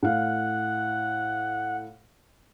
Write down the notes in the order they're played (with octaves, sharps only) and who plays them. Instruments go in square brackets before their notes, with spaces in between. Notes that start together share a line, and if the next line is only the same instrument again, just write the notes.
[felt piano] A2 F5 [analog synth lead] F#5